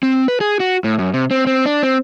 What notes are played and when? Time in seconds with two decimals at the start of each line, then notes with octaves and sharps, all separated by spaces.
0.03 C4
0.28 B4
0.41 G#4
0.60 F#4
0.84 A2
0.99 F#2
1.14 C3
1.31 C4
1.47 C4
1.66 D4
1.83 C4